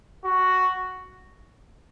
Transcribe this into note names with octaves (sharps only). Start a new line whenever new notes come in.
F#4